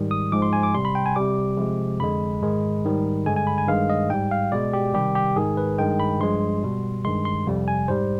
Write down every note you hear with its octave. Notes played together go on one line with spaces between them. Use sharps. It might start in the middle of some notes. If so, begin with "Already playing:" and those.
Already playing: G#2 D#3 G3
D#6
G#2 F3 G#3 D6
C6
G#5
D6
C3 G3 C6
B5
G5
G#5
C3 G3 D6
C3 F3 G#3
F2 D3 G#3 B5
G#2 D#3 G#3
G#2 D#3 G3
G2 D3 G#3 G#5
G#5
B5
G#5
G2 D#3 G#3 F5
D#5
G#2 G3 G5
F5
B2 G#3 D5
G4
C3 D#3 G3 G4
G4
G#2 D#3 G#3 G#4
B4
G2 D#3 G#3 G5
B5
G2 F3 G#3 C6
B2 G3
G2 D#3 G#3 C6
C6
F2 C3 G3
G#5
G#2 G3 C5